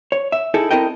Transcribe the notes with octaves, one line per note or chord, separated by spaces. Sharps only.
C#5
E5
D#4 E4 G#4 A4
C4 E4 A4 A#4 D#5 G5